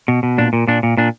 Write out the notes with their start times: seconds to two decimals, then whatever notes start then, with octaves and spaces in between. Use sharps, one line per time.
0.08 B2
0.23 B2
0.38 A#2 D4
0.53 A#2
0.67 A#2 D4
0.83 A#2
0.97 A#2 D4